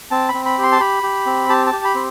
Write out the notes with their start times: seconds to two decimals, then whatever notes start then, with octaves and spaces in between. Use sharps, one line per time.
0.11 C4 A5
0.29 B5
0.34 C4
0.45 B5
0.58 G4 C6
0.72 A5
0.80 G4 B5
1.03 G4
1.26 C4
1.49 G4 A5
1.67 A5
1.73 G4
1.85 B5
1.95 C4